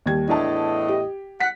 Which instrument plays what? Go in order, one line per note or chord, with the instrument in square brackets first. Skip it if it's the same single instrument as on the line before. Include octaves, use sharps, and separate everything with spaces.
[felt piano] D#2 G3 G#6
[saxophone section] E2 A2 D#5 [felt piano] D4 A5
[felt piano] G4
[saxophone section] F#5 [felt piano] B6